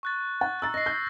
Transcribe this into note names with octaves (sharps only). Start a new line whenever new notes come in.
C#6 F#6 A6
F#5 A6
A#5 E6 A6
D#5 A#6 C7
G6